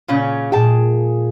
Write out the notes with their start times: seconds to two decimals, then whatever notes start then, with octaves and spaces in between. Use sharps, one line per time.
0.08 A#2 C#3 C#4
0.52 A#2 G#4 G5 A5